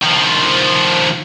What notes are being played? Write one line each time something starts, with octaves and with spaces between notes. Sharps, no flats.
D#3 F3